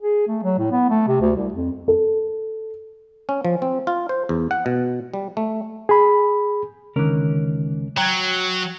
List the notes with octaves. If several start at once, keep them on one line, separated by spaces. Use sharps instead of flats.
G#4
A3
F#3
A2
B3
A3
C3
D2
C2
F2
A4
C#4
F3
C4
F4
C5
E2
F#5
B2
G3
A3
G#4 B5
C#2 D3 D#3 C#4 A#4
F#3 G5 A#5 G#6